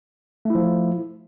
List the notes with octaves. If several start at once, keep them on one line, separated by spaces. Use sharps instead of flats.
F3 A3 E4